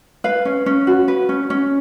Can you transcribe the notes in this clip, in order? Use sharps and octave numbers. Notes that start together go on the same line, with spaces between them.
B4 F5
C#4
C#4
F#4
B4
C#4
C#4